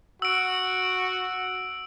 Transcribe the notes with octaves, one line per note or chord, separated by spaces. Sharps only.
F#4 E6 D7